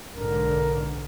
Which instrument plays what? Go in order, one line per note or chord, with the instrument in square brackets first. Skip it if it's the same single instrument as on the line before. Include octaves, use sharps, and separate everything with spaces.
[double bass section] B1 G#2 D3 [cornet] A#4